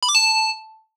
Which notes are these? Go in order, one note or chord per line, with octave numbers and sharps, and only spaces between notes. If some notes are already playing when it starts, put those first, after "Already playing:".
B5
D6
A5